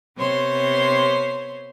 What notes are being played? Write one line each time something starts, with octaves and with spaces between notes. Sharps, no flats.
C3 B3 C5 C#5 C6